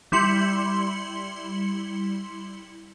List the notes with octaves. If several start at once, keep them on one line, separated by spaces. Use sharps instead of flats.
G3 E4 C6 C#7 F#7